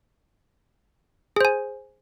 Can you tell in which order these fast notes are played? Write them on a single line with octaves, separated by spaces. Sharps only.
G#4 C5 G#5